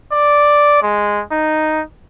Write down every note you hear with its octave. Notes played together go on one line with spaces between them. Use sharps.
D5
G#3
D#4